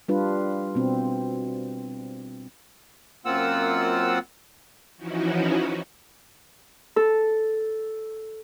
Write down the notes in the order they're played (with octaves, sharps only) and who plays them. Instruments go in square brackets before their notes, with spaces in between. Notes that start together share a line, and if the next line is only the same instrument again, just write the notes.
[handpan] G3 D4 F4 B4
B2 C4
[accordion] F#2 A#3 C4 F4 F#5 E6
[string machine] E3 F3 C#4 D#4 E4 F#4
[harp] A4